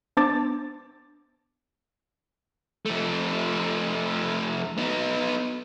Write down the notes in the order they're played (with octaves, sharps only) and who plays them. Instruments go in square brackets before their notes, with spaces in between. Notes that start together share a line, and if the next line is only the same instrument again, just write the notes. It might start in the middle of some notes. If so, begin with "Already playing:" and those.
[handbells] B3 D4 C5 A5 D6 A6
[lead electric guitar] F2 A3
B3 D#4